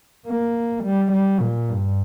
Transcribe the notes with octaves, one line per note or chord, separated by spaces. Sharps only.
A#3
G3
G3
A#2
G2